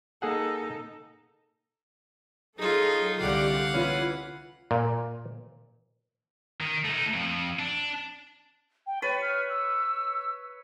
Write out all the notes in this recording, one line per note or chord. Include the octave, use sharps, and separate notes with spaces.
A#3 D#4 G#4 A4 F#5
F#3 D#4 F4 G#4 A4
C2 D3 G4 D5 F5 F#5
E3 C#4 F4 B5
A#2
D#3
A3 D#4
F2
D4
G5
B4 C#5 A6
F6
E6